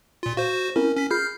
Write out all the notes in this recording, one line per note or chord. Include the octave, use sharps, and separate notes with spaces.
A#2 F4
F#4 C5 F5
C4 C#4 E4 A#4
C#4 B6
F4 G#4 B5 F6 G6 C7